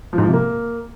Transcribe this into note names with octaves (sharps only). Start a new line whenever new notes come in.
F3
G#2
F3
C3
A#3